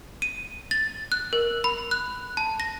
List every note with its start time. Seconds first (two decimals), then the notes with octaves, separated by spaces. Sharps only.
0.22 D#7
0.71 A6
1.12 F#6
1.33 A#4
1.64 B5
1.91 F#6
2.37 A5
2.60 A#6